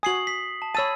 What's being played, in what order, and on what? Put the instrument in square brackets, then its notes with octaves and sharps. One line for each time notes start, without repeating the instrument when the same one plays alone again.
[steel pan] F#4 G#5 [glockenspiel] D#6 C7 F#7
[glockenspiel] B6
A5
[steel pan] C#5 A5 [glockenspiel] B5 E6 D#7